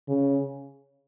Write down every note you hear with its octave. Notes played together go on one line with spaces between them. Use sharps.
C#3